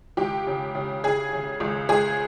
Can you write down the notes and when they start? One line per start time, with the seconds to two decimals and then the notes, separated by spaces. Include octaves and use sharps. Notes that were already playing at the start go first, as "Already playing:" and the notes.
0.17 C#2 G4
0.47 C#3
0.75 C#3
1.04 C#3 G#4
1.33 C#3
1.60 C#2
1.89 C#2 G#4